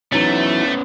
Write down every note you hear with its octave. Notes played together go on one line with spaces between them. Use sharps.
E3 F#3 A3 B3 C#4 D#4